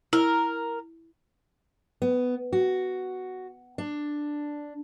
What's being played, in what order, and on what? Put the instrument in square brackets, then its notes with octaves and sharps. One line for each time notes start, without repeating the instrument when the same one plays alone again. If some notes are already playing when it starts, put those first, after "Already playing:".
[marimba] E4 [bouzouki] A#4
[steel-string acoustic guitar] B3
F#4
D4